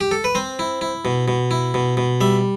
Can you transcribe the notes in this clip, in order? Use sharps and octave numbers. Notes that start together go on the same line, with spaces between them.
G4
A4
B4
C4 C5
E4
E4
B2
B2
E4
B2
B2
G3 E5